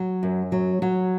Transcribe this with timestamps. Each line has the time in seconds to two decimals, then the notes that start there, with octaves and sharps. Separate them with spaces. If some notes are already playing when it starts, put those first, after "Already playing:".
Already playing: F#3
0.23 F#2
0.52 F#3
0.82 F#3